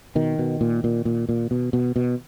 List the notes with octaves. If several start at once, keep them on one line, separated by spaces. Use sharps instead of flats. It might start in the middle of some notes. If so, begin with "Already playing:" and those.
B2 D#3
B2
A#2
A#2
A#2
A#2
B2
B2
B2